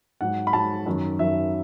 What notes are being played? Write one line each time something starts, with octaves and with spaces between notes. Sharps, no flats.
G#2 F#3 F#5
B5
G#2 F#3 A5
F#2 D#3 F#3
F#2 D#3 F#3 E5